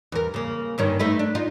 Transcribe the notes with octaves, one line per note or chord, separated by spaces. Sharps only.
E2 A#4
C#3 A#3
G2 D#3 C#4
A3 D#4 B4
D4
D#4 F4